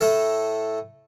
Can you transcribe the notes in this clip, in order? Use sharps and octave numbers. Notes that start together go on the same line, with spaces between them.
A2 A3 A4